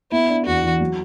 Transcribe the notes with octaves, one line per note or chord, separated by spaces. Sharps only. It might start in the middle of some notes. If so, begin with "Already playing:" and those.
B3 E4
D4
E2 F#4
E3
F#3